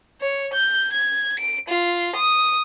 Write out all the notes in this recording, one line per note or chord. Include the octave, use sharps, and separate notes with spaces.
C#5
G6
G#6
D7
F4
D#6